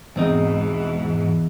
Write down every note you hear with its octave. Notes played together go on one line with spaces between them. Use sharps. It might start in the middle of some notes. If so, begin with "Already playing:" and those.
E2 G#2 B2 E3 C4 D#4